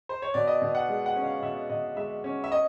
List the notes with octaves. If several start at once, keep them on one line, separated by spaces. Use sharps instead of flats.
C5
C#5
B2 D5
D#5
B2
F#5
G#3
F#5
C#4
F5
B2 E5
B2 D#5
G#3 E5
C#4
E5
D#5